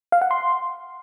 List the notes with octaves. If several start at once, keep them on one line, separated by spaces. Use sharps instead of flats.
F5
F#5
C6